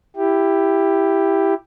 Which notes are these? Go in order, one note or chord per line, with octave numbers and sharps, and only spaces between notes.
E4 G4